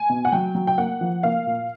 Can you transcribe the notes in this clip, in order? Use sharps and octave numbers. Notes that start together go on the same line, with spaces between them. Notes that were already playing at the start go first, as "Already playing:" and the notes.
Already playing: G#5
B2
F#5
F#3 G5
F#3
G5
A#3 F#5
F3
A#3 F5
A#2